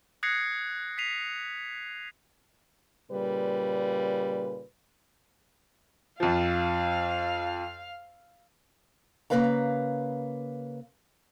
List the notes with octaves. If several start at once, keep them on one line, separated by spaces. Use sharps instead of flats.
D#6 F#6 G#6 A#6 C7 C#7
B6 C7 D#7 F7
A#2 C#3 G3 B4
F2 F3 F5
C#3 A3 A#3 B4 F5 A#5